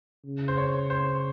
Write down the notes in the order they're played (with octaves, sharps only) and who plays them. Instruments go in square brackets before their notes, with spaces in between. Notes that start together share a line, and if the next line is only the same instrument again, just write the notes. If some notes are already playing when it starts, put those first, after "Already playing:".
[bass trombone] C#3
[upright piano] C5
C#5
C5